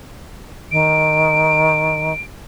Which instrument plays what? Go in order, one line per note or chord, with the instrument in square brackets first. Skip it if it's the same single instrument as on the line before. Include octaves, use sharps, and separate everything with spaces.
[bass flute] D#3 [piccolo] D7